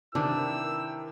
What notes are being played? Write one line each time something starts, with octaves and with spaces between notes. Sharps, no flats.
C3 D#3 E3 D4 E4 A#4 G5 E6